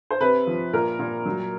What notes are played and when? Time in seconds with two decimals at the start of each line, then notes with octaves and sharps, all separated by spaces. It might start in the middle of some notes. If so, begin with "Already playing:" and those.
0.11 C5
0.21 C3 B4
0.47 F3
0.73 A#2 A#4
0.99 A#2
1.26 F#3